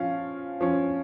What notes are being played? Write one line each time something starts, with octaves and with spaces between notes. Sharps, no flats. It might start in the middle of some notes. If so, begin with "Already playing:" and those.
Already playing: F3 C#4 F5
F3 C#4